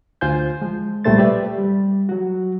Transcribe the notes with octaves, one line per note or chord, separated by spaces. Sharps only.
D2 F4 C5 G#5 G6
F3 G#3
C2 A#2 G3 A3 C5 A6
G4 B4 D5 E5
G3
F#3 F#4